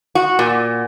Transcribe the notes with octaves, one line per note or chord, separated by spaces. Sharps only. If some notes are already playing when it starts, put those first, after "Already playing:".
F#4
A#2